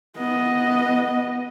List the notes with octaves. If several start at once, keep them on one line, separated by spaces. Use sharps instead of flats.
B3 D#5